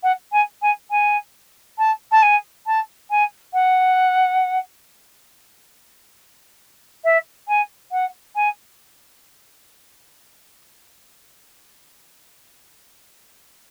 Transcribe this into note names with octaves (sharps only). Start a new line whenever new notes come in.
F#5
G#5
G#5
G#5
A5
A5
G#5
A5
G#5
F#5
E5
G#5
F#5
G#5